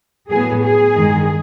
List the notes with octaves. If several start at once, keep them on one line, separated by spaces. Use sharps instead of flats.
A2 F#3 B3 G#4
G#4
G2 D#3 G#3